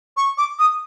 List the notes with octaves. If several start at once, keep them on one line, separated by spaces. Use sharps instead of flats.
C#6
D6
D#6